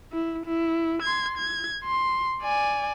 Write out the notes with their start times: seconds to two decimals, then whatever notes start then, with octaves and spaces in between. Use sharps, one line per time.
0.13 E4
0.46 E4
1.02 C6 G#6
1.38 G#6
1.85 C6
2.42 D5 G#5